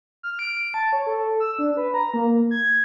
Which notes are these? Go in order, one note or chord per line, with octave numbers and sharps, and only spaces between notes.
F6
D7
A5
C#5
A4
E6
D4
B4
A#5
A#3
G#6